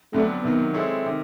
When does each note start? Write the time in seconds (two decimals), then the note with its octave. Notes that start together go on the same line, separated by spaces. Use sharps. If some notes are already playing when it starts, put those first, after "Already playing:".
0.13 F2 D3 F#3 A3 B3 D4
0.43 C3 D#3 F#3 B3
0.74 G#3 C4 E4 A4 C#5
1.06 C3 D#3